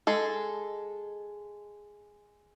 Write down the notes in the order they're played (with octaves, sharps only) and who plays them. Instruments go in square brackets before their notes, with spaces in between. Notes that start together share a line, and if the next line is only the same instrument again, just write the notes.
[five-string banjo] G#3 A4